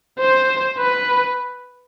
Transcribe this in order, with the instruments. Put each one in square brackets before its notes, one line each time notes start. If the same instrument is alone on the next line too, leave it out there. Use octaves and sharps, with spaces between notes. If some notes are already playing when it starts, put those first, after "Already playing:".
[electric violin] C5
B4